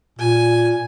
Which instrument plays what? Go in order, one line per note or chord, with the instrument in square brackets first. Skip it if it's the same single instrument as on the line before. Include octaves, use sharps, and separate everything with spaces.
[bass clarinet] A#2 [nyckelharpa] G#5